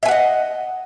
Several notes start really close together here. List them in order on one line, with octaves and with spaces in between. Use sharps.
E5 G#5 F#5 D#5